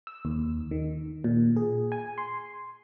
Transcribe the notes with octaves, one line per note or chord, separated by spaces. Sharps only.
E6
D#2
D#3
A#2
G#4
G#5
C6